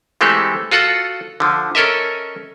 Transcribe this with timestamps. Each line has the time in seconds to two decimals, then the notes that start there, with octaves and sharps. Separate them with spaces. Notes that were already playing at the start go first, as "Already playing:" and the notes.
0.21 E3 G#3 A3 C4 G4 A4
0.71 F4 F#4 A4 F#5
1.40 D3 F3
1.75 C#4 A4 A#4 D#5 E5